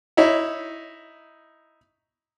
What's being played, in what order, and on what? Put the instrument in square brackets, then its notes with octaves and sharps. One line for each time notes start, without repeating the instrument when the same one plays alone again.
[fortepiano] D#4 E4 C#5